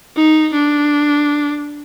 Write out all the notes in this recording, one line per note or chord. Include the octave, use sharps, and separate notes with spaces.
D#4
D4